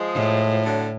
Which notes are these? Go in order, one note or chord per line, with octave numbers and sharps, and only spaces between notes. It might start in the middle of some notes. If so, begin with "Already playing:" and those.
Already playing: F3 G#3
A2
F3
D3 F#3